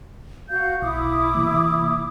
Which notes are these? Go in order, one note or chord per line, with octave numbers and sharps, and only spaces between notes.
F#4 F5 G6
B1 E4 D6 D#6
C3 E3 A#3